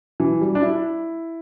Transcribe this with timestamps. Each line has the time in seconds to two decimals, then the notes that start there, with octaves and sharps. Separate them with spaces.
0.20 E3
0.41 G3
0.55 D4
0.62 E4